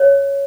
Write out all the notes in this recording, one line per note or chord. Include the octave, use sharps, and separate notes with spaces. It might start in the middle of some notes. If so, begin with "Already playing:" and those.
Already playing: C#5